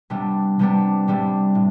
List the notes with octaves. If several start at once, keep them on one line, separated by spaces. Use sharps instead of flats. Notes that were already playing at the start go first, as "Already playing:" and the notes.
C3 G3 B3 D4
C3 G3 B3 D4
C3 G3 B3 D4
A2